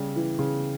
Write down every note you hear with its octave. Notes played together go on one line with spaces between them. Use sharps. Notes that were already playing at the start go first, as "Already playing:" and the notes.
Already playing: C#3 G3
E3
C#3